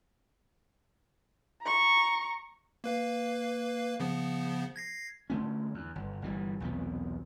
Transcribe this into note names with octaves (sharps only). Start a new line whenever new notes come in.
A#5 C#6
A#3 B4 F5
C#3 F3 B3
G#6 A#6 C7
D3 A3 C#4
E2
G1
G1 E3 G3
B1 E2 C3 B3